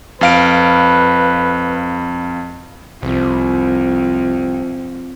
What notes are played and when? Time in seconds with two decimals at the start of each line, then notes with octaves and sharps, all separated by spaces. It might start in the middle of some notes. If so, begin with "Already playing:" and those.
0.21 F2 B4 F5 D7
3.03 C2 F2